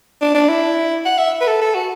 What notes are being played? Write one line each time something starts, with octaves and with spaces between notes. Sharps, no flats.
D4
D4
E4
F#5
E5
B4
A4
A4
F#4